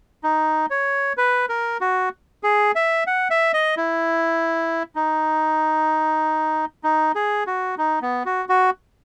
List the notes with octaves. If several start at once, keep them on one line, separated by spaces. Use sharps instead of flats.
D#4
C#5
B4
A#4
F#4
G#4
E5
F#5
E5
D#5
E4
D#4
D#4
G#4
F#4
D#4
B3
F#4
F#4